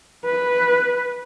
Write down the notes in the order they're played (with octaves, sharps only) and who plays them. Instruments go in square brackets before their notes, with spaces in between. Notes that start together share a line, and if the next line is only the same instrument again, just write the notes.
[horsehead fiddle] B4